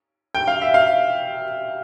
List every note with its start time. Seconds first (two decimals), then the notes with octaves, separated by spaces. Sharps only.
0.35 G5
0.48 F5
0.62 E5
0.74 F5